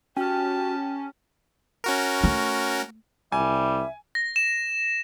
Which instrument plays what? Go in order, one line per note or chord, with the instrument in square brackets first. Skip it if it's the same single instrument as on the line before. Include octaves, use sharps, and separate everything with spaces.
[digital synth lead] C#4 [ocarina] F#4 [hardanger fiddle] G4 A5 [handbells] G5 F6
[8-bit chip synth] C#4 F#4 A#4
[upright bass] A3
[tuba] C2 [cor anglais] G3 [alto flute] E5 [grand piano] G#5
[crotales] A#6
E7